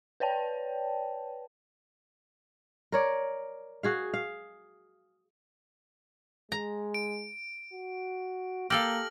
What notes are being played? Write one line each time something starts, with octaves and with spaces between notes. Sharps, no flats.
B4 C#5 D5 G5 A5
A#4 C#5 D5
F#4 G#4 F5
F5
G#3 A#5
D7
F#4
A#3 G4 A4 F5 F6 A#6 F#7